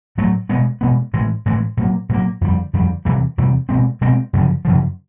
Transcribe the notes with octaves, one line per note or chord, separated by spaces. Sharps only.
A2 F#3 A3
B2 G#3 B3
B2 G#3 B3
A2 E3 G#3
A2 E3 G#3
A#2 F#3 A#3
A#2 F#3 A#3
F2 D3 G3
F2 D3 G3
E2 C3 E3 G3
E2 C3 E3 G3
B2 G#3 C4
B2 G#3 C4
F#2 C#3 F3
F#2 C#3 F3